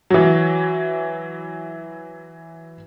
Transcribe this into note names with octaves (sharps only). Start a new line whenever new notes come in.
E3 F#3